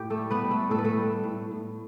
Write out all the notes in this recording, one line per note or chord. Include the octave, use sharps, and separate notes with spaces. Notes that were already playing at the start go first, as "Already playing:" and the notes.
Already playing: A2 G4
A3 A4
G3
B3 B4
G3
A3 A4
A2 A4
B4
A3 A4
G3
A2
A2